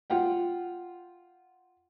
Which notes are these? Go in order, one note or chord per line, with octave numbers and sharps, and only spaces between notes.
F4 F#5 G5